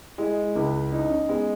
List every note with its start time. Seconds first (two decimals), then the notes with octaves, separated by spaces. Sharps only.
0.18 G#3 E4
0.55 C#2 E4
0.92 D#4 E4
1.10 C#4
1.29 G#3 B3